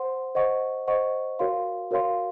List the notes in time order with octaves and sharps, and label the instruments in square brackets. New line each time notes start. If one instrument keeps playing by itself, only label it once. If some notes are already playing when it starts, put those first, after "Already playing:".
Already playing: [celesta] C5 F#5 C6
C5 D#5 F#5 C#6
C5 D#5 F#5 C#6
F#4 A#4 C#5 F5 C6
F#4 A#4 C#5 F5 C6